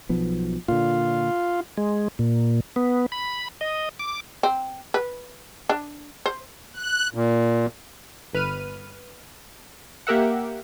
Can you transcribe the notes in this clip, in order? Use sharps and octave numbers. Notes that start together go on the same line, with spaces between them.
B1 F3 B3
A#2 D3 F4
G#3
A#2
B3
B5
D#5
D6
C4
B4
D4
C5
F#6
A#2
G1 B4 F6 D#7
A#3 G4 A#4 E5 F#5